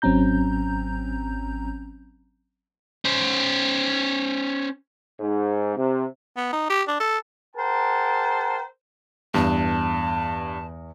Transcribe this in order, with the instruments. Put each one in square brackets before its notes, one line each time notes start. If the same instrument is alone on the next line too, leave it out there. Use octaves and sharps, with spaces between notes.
[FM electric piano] G#1 F#3 C4 C#4 A#5 G6
[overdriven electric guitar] C#4 C5
[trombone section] G#2
C3
[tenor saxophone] B3
D#4
G4
D4
A4
[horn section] G#4 A#4 C5 F#5 G5 A5
[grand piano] E2 [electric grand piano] G2 [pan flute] A5